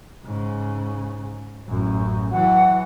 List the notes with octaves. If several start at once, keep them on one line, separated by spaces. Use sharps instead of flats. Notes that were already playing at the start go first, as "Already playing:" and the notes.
G#2 C#3
A1 F#2
E3 F#3 F#5